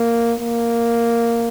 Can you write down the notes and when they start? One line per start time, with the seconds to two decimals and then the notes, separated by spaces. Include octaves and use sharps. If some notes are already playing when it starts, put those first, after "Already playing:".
Already playing: A#3
0.40 A#3